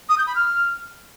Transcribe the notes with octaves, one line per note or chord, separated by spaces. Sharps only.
D#6
G6
B5
F6